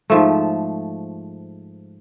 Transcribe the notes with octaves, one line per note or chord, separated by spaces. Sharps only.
G#2 F3 A3